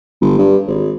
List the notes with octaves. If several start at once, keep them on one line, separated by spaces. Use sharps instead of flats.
G1
G2
G#1